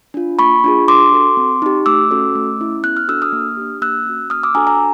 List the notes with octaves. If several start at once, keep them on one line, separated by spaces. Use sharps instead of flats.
D4 F4
A#3 B5 C#6
D4 F4 G#4
D4 C6 D6
F#4 A4
C4
D#4 G4
A3 D6 E6
C#4 F#4 A4
A3
C#4 E4
B3 F#6
F6
D4 F#4 A4 E6
D#6 F6
A#3
D4 G4
A#3 E6 F#6
C#4 F#4
A#3 D#6 F6
D6 E6
D4 F#4 A4 G#5 A#5
G#5 A#5